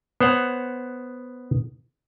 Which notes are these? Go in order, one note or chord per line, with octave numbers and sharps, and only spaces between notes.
B3 C5 C#5 F#5